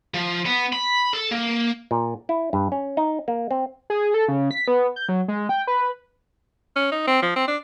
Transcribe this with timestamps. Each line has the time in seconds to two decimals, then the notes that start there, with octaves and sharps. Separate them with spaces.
0.14 F3
0.46 B3
0.73 B5
1.14 A4
1.31 A#3
1.91 A#2
2.29 E4
2.53 G2
2.72 C#4
2.97 D#4
3.28 A#3
3.51 C4
3.90 G#4
4.14 A4
4.28 C#3
4.51 B6
4.68 B3
4.96 G6
5.09 F#3
5.28 G#3
5.49 G5
5.67 B4
6.76 C#4
6.91 D#4
7.07 C4
7.22 F3
7.36 C4
7.47 D4